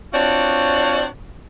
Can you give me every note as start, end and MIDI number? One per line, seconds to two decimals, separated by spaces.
0.13 1.05 60
0.13 1.05 62
0.13 1.05 65
0.13 1.05 66
0.13 1.05 73
0.13 1.05 74